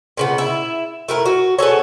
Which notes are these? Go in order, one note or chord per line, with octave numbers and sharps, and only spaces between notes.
A#2 C#3 B3
E4
A3 E4 A#4
F#4
B3 G#4 A4 C#5